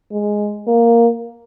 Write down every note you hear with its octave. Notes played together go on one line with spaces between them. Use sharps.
G#3
A#3